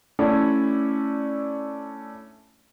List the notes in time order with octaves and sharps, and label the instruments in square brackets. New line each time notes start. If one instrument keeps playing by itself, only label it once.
[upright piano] A3 C#4 D4 E4